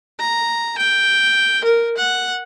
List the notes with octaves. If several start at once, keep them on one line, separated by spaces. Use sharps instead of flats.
A#5
G5
A#4
F#5